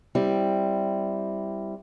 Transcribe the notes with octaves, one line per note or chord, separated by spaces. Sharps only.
G3 C4 E4